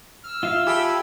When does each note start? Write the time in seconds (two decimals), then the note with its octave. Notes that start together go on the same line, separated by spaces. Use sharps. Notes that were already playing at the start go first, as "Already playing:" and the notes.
0.24 E6 F6
0.43 F4 E5 F5
0.67 G4 A4 G#5 B5